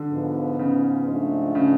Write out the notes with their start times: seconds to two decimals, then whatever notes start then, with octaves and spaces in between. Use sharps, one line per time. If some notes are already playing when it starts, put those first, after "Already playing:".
Already playing: D3
0.12 G#2 F3 B3
0.59 C#3
1.08 G#2 F3 A3 D4
1.55 C#3